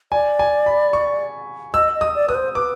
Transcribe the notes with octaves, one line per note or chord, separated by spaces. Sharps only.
D5 G#5
G#5
B5
C#6
D#5 E6
D#5
D#6
D5
B4 D#6
C5
B4 D6